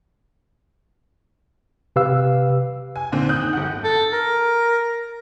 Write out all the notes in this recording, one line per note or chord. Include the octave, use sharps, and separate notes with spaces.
C3 G4 B4 F5 E6
G#5
A#2 D3 D#3 C4
D#6 F#6 G6
D#3
G1 F#5
A4
A#4